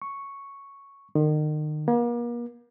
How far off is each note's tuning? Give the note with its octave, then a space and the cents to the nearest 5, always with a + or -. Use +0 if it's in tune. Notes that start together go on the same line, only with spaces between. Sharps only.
C#6 +0
D#3 -35
A#3 +40